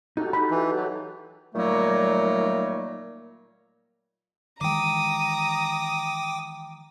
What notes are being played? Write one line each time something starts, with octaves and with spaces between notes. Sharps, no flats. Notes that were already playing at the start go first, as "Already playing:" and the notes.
D#4 F#4 G4 A4
B5
E3
F#3
A#2 D#3 F#3 G3 A3 A#3
D#3 E3 G#3 G5 A#5 D6 D#6